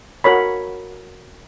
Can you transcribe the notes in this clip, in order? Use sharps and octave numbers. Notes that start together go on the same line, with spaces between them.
F#4 A#4 C#5 B5